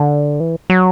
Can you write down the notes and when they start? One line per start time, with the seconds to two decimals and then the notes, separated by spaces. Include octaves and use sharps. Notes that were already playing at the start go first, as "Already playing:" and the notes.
Already playing: D3
0.40 E3
0.70 F#3